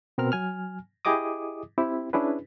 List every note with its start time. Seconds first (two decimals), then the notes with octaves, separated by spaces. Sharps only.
0.18 B2 C4 A#4 F6
0.32 F#3 G#5 F6
1.05 E4 G4 G#4 D#5 D6 D#6
1.78 C4 E4 G4
2.13 C#4 D4 E4 G#4 B4